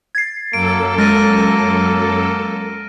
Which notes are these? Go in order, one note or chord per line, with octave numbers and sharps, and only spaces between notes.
G#6 A6 C7
F#2 A#3 A4 D7
G#3 A#3 F6 A6 A#6 D#7